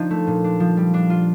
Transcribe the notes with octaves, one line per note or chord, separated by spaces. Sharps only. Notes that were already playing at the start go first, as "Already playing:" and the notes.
Already playing: F3 D4 D#4
A3
A#2
D4
F3
G3
D4
F4